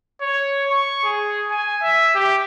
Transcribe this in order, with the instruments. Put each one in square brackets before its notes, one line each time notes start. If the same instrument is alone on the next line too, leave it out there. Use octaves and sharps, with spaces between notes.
[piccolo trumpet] C#5
C#6
G#4
G#5
E5
G4